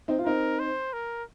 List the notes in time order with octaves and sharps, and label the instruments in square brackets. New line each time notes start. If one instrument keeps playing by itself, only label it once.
[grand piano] C4 D#4
F4
[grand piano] C4 D#4 [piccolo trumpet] A#4
[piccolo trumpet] C5
A#4